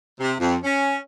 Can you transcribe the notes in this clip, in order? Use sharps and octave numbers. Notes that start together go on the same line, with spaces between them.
C3
F2
C#4